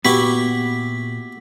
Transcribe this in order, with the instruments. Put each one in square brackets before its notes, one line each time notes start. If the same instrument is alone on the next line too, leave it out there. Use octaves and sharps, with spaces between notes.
[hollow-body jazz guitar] A#2 B4 [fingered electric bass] B3 [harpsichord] E4 F#4 G4 [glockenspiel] B6